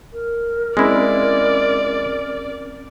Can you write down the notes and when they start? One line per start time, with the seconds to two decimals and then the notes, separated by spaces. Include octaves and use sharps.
0.13 A#4
0.77 G#3 C4 C#4 E4 D5 B5